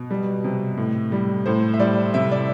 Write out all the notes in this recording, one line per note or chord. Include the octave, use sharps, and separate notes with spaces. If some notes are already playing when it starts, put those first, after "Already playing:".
Already playing: B2
G3
C3
A2
G3
A2 C5
E5
G3 D5
C3 E5
D5